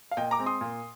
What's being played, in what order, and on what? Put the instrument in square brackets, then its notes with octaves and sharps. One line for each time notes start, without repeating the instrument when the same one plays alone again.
[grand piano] F5
A#2 D#5 G5
A#5 D6
G#3 C4
C6 D#6
A#2